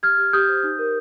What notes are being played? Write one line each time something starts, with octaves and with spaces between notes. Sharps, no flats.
G4 F6 G#6
G4
G4 D#6 G6
C5
D#4
A#4